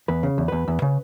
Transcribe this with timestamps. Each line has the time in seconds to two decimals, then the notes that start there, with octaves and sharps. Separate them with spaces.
0.08 E2 B4
0.23 C#3
0.38 E2
0.48 E2 B4
0.68 E2
0.82 C#3